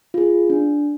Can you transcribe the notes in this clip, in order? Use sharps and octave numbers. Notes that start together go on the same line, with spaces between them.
F4 G#4
D4